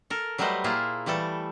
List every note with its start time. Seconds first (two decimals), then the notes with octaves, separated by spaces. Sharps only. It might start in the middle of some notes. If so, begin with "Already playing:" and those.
0.10 A4 A#4
0.38 F#3 G3 A3 B4 C5 D#5
0.64 A#2 A#3 E4 F4 G#4
1.06 E3 G3 A3 A4